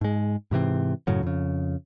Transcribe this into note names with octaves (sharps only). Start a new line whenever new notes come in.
G#2 G#3
G#2 C3 E3 C4
F#2 A2 C#3 F#3
F2 C#3